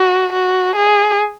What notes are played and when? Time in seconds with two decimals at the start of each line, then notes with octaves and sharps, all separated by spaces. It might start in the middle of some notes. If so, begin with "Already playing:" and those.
Already playing: F#4
0.33 F#4
0.76 G#4